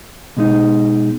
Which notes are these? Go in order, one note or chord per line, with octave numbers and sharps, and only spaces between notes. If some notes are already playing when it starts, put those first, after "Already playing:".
B2 G#3 D#4